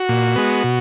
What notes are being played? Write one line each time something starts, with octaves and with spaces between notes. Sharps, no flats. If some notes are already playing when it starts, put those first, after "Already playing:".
Already playing: F#4
A#2
G#3 B3
B2